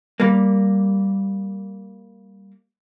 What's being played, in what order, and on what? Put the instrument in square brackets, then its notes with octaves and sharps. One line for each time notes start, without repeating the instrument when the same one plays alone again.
[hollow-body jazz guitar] G3 A#3